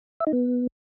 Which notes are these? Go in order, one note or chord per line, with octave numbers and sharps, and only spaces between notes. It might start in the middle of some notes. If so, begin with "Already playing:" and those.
E5
D#4
B3